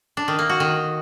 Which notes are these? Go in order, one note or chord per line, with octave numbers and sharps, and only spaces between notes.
D4
D#3
A#3
F#4
D#3